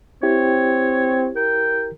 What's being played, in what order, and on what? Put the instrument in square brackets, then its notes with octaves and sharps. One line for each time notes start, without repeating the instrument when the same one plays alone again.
[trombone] C4 [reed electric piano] E4 G4 [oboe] C#5
[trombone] A#4 [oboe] G5